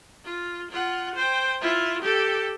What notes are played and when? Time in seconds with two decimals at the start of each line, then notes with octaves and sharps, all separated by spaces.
0.25 F4
0.71 F4 F#5
1.16 C5 G5
1.61 E4 F4
2.02 G4 A4